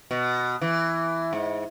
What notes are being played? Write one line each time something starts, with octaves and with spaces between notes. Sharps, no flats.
B2
E3
G#2